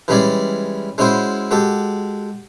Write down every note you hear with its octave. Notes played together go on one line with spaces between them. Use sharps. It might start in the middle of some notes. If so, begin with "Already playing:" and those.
E3 G3 G#3 C#4 G#4 D5
G#3 C#4 E4 F#4 C5
G#3 F#4 G4 A4